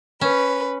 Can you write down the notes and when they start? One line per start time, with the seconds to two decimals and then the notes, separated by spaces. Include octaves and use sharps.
0.21 C#4 B4